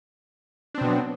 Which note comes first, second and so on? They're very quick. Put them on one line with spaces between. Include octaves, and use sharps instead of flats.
D4 C4 B2 B3 F#3